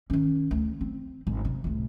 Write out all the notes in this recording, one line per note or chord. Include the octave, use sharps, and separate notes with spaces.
D#3 C#4
D2
C4
G#1
C3
C2 A2